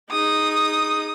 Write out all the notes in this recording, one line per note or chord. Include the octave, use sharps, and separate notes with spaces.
D#4 G#4 D#6